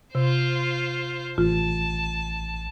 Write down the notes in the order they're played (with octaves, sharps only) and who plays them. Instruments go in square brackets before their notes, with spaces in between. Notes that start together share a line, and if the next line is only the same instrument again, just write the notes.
[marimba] C3 [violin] F4 C5
[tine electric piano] A1 [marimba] F4 [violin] A5